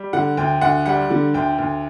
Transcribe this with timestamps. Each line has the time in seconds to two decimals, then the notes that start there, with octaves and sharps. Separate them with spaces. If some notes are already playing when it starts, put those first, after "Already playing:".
Already playing: G3
0.13 D3 F#5
0.37 D2 G5
0.61 D2 F#5
0.86 G3 F#5
1.10 D3
1.34 D2 G5
1.59 D2